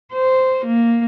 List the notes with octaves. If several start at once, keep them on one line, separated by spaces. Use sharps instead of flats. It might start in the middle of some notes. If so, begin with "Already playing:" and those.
C5
A#3